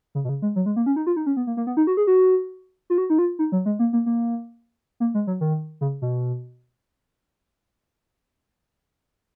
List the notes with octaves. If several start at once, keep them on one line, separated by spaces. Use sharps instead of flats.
C#3
B2
C#3
G#3
F#3
G#3
A#3
C#4
D#4
F4
D#4
C#4
B3
A#3
A#3
B3
D#4
F#4
G#4
F#4
F4
F#4
D#4
F4
D#4
F#3
G#3
A#3
A#3
A#3
A#3
G#3
F#3
D#3
C#3
B2